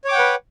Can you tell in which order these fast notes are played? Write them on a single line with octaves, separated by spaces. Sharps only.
C#5 D6 G5 F#5 B4